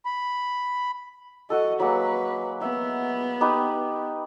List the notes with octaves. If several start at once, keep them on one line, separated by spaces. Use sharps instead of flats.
B5
F#4 A4 D#5
F#3 G#3 A#3 B4
B3 E5
D#4 G4 B4